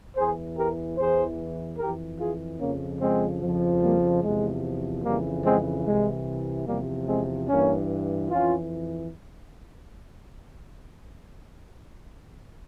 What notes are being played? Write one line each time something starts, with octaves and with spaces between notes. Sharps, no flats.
E2 E3 G#4 C5
G4 A#4
E2 E3 G#4 C5
F2 E3 G4 A#4
F4 G#4
F2 C#3 F3 A#3 C#4
G#3 C4
F2 C#3 F3
G3 A#3
E2 C3 F3 G#3
F2 C#3 E3 G3 A#3
G#3 C4
C2 C3 E3 G#3
E2 C3 F3 G3 A#3
G#3 C4
G2 E3 A#3 C#4
F2 E3 C#4 F4